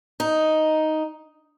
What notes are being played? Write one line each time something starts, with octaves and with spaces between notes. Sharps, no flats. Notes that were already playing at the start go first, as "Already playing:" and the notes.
D#4